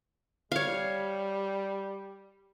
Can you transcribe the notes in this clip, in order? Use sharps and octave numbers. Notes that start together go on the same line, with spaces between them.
G3 C#5 F5